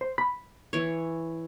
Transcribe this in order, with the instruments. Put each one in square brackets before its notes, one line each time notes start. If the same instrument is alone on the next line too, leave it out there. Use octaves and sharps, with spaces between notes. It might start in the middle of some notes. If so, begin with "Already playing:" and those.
[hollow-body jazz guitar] C5
B5
[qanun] E3 C#5